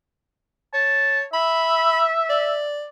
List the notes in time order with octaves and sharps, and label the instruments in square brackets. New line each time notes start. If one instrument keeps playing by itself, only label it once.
[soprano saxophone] C#5 [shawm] A5
[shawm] E5 [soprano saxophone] B5
[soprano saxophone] D5